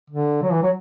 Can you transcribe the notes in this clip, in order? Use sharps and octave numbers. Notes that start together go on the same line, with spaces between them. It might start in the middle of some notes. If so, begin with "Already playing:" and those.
D3
F#3
E3
F#3